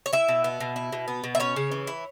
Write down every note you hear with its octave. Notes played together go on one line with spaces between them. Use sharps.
C#5
E4 E5
B2
B3
B2
E4
B2
B3
B2
E5
C#4 C#5
C#3
E3
E4